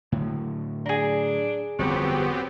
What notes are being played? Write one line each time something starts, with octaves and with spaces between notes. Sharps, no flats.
A2 D3 F#3
D4 G#4 A#5
G1 F2 F3 F#3 B3 C4 G4